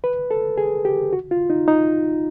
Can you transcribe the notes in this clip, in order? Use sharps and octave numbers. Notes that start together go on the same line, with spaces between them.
B4
A4
G#4
G4
F#4
F4
D#4
D#4